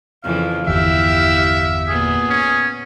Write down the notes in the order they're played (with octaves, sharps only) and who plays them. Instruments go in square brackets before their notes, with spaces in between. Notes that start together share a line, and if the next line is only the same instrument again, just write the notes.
[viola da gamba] F2 C#3 E3 [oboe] F5
[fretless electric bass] G1 E2 [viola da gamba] E4 G4 [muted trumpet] E5
[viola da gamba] A#2 B3 [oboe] G#4
[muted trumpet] C#4